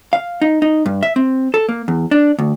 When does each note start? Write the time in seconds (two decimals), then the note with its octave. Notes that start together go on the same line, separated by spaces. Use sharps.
0.13 F5
0.42 D#4
0.62 D#4
0.86 G2
1.03 E5
1.16 C4
1.54 A4
1.69 A#3
1.88 E2
2.11 D4
2.39 D2